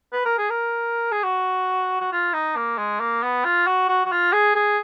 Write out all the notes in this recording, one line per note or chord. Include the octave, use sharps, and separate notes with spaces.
B4
A#4
G#4
A#4
G#4
F#4
F#4
F4
D#4
A#3
G#3
A#3
B3
F4
F#4
F#4
F#4
F4
G#4
G#4